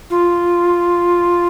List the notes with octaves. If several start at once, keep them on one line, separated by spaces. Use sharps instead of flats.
F4